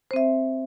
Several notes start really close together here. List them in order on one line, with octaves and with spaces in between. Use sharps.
C5 C4 E5